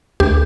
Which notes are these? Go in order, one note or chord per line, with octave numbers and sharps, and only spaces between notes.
D2 G4